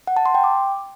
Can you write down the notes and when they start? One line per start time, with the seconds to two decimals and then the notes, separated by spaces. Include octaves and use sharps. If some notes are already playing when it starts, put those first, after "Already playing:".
0.07 F#5
0.17 A5
0.26 C6
0.35 G5
0.44 D6